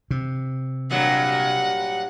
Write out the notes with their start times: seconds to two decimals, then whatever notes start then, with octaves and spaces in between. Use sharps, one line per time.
0.11 C3
0.91 G2 A#2 F#3 F#5